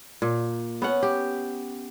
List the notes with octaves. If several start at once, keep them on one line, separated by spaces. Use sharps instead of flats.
A#2
B3 C#4 F#5
G4